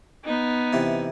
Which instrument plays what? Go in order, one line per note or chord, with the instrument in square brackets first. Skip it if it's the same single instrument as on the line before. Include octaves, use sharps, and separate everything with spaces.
[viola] B3 D#4
[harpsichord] C3 E3 C4